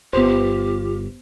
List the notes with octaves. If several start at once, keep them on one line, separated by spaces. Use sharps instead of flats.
G1 B3 F4 G4 C5